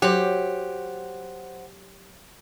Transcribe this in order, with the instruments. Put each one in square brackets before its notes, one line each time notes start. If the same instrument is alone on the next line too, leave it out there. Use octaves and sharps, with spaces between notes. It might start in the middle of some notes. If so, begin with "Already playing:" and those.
[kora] F#3 [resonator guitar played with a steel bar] G4 [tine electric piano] C5 F#5